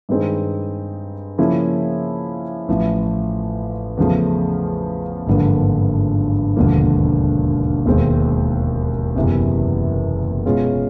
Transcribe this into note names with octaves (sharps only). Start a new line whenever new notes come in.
G2 D#3 G#3 C4 D#4
C#3 F3 A#3 C#4 E4
A1 A2 F3
E2 C#3 F3 A3
G#1 G2 D3 F3 A#3
E1 D#2 D3 F3 A#3
E1 D#2 D#3 G#3 C4
F#1 E2 C3 E3
B2 G#3 C#4 F4